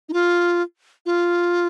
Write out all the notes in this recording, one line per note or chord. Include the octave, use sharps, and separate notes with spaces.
D#4
F4
F4